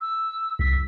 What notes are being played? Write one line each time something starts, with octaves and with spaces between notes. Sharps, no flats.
E6
C2 B6